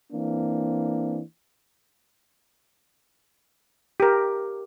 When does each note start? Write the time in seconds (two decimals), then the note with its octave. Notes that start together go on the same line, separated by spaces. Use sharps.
0.13 E3 A#3 C4 D4
4.00 G4 A#4